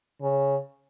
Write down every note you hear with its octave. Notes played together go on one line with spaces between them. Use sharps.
C#3